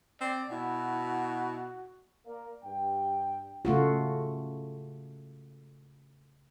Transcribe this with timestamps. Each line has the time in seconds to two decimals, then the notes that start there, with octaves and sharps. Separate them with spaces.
0.21 C4 D5
0.51 B2 E4 F#4
2.26 A#3 A#4 D5 F5
2.64 G2 G5
3.65 C#3 A3 F4 F#4